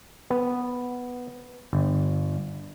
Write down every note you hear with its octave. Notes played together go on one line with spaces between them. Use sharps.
B3
G1